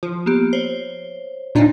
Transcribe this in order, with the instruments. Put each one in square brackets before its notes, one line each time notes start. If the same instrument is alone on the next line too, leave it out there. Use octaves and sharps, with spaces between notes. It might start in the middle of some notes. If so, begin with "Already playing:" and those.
[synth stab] F3
[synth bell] A#3 B3 G4
C5 C#5
[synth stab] A#2 D4 D#4